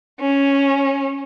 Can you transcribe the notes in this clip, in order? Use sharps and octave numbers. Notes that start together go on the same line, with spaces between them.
C#4